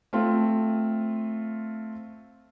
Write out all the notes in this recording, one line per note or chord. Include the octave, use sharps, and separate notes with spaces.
A3 C4 F4